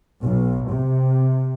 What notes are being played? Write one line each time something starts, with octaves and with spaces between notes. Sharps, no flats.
B1
C3